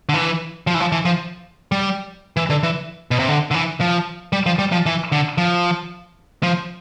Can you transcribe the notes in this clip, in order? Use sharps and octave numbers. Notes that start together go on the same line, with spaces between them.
D3
E3
F3
E3
F3
E3
F3
G3
E3
D3
E3
B2
C3
D3
D3
E3
F3
G3
F3
G3
F3
E3
D3
F3
F3